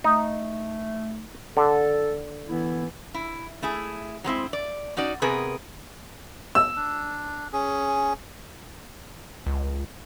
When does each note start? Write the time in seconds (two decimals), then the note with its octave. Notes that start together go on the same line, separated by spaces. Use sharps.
0.04 A3 D#4
1.57 D3 A4
2.49 E3 B3 E4
3.14 E4
3.62 A3 E4 G#4
4.24 F#3 G#3 C4 E4
4.53 D5
4.97 C#4 D#4 F#4 D5
5.22 C3 B3 G#4 A#4 B4
6.55 E6
6.76 D4
7.53 C#4 G#4
9.46 C#2